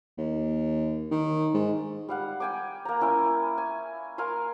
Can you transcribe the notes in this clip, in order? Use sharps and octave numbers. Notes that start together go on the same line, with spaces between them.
D#2
D#3
G#2
G3 F5 F#5
G5 G#5 D6
A#3 A#5
C#4 E4 G5 G#5
G#5
A#4 F5 G#5 C6